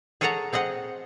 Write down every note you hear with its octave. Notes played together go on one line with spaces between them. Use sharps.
G#4 A4 C#5 F#5 A5 A#5
C4 G#4 D#5 F#5